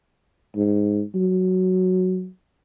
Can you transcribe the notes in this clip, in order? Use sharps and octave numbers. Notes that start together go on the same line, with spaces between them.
G#2
F#3